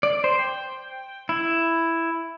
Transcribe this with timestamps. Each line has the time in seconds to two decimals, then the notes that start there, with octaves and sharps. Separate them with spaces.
0.03 D5
0.24 C5
0.39 G5
1.29 E4